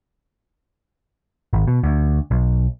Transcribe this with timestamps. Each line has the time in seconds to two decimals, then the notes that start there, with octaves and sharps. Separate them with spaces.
1.53 G#1
1.68 B2
1.84 D2
2.31 B1